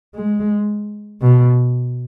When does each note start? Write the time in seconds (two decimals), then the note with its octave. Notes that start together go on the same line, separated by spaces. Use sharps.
0.15 G#3
1.22 B2